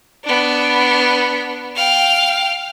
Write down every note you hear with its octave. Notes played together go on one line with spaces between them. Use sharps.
B3 D4
F5 G5